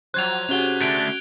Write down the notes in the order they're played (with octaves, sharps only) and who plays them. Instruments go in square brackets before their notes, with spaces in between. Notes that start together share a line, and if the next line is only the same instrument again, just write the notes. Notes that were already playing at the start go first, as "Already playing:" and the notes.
[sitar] F3 F#3 C5 [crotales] F#6 G#6 F7
[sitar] C3 G#4 [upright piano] C#4 F#4 [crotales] F7 G7
[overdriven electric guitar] D3 A3 [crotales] D7